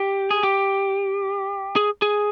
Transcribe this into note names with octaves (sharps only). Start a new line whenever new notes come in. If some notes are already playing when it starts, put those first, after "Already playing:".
Already playing: G4
G#4
G4
G#4
G#4